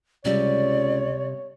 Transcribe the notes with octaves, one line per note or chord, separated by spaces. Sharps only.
C#2 C3 G3 C#5 D5